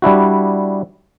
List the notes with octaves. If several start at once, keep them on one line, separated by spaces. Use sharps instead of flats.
G3 D4 E4 F#4